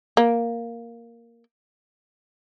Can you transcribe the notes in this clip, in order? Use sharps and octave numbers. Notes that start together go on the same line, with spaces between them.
A#3